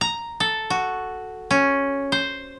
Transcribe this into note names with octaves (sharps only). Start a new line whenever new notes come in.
A#5
A4
F#4
C#4
C5